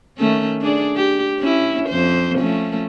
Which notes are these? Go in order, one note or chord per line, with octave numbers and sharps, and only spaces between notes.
D#3 A3 C#4
D4 G#4 D5
G4
C#4 E4
F2 C5
F3 A3 C#4